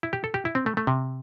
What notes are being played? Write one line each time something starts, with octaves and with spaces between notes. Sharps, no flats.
E4
G4
A4
G4
E4
C4
A3
A3
C3